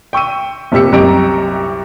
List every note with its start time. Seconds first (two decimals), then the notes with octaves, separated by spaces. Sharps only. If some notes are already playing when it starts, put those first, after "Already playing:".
0.13 G5 C#6 E6 D#7
0.72 F1 A#2 G4 E6 C#7
0.92 C2 F#2 G4 D#5 A#5 D7